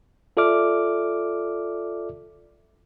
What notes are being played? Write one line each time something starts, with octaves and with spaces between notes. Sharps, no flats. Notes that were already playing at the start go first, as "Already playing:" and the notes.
F4 A4 D5 E5 D6 F6